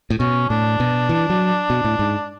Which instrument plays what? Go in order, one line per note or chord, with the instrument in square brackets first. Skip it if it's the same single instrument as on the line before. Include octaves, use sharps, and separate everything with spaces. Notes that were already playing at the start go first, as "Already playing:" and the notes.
[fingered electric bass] A2
[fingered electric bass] B2 [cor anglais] C#4
[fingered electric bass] A2 [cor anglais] D4
[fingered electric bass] B2
E3
F#3
B2
A2
G#2